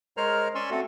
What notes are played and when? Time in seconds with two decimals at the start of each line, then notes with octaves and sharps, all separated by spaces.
0.17 G#3 A#4 C5 C#5 A#5 F6
0.55 C#4 D5 G#5 C6 C#6 E6
0.71 A3 C4 F#4 A4